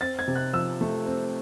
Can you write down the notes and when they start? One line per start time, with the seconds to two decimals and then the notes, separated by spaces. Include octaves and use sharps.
0.01 C4 A6
0.19 G#6
0.28 C3
0.36 F#6
0.53 F3 E6
0.81 A3
1.06 C4